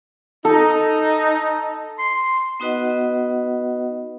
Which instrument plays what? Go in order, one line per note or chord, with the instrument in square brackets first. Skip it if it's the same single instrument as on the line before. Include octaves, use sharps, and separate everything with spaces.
[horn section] D#4 [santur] A4
[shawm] C6
[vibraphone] B3 D#4 F#4 B4 D#5 F#5